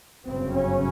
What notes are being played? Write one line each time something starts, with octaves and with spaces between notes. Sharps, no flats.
G1 F#2 C#3 C4
C#4